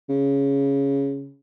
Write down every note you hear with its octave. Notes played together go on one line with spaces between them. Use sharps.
C#3